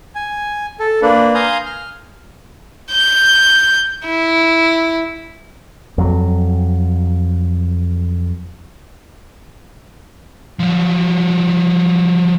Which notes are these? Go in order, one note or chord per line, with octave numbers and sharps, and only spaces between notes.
G#5
A4
A#3 D4 B4
F5 G#5 A#5 C6 D#6 G6
F6
G6
E4
F2 F#3
F3 F#3